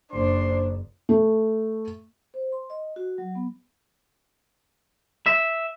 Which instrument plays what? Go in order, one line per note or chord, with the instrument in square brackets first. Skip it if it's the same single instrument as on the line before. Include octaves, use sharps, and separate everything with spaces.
[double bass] F#1 [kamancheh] D4 [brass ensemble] C5 [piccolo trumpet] C6
[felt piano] A3
[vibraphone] C5
C6
D#5
F#4
F#3
B3
[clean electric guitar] E5